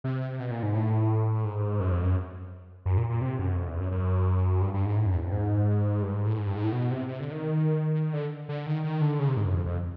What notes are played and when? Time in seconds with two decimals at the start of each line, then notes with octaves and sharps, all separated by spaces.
0.04 C3
0.40 B2
0.51 A#2
0.63 G#2
0.74 A2
1.45 G#2
1.80 F#2
1.92 F2
2.04 F#2
2.86 F#2
2.97 A#2
3.09 A#2
3.21 C3
3.39 F#2
3.56 F2
3.68 E2
3.80 F#2
3.91 F#2
4.61 G2
4.74 G2
4.85 G#2
4.97 A2
5.06 F#2
5.15 E2
5.23 F2
5.32 G#2
6.02 G2
6.14 G#2
6.26 A2
6.38 G#2
6.47 G2
6.56 G#2
6.64 A2
6.73 B2
6.91 C3
7.08 C3
7.20 D3
7.31 D#3
8.13 D3
8.49 D3
8.66 D#3
8.84 D#3
9.02 D3
9.19 C#3
9.28 C3
9.37 G#2
9.45 F#2
9.55 F2
9.66 F2